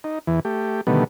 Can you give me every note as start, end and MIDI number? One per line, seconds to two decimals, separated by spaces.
0.04 0.19 63
0.27 0.40 40
0.27 0.40 52
0.45 0.81 57
0.45 0.81 67
0.87 1.04 47
0.87 1.04 50
0.87 1.04 51
0.87 1.04 55
0.87 1.04 57
0.87 1.04 59